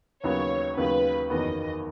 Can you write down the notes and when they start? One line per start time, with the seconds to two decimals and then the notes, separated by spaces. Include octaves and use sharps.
0.24 D#2 C#3 F#3 B3 C#5
0.77 D#2 C#3 F#3 B3 B4
1.29 F#1 E2 D#3 F#3 B3 D#5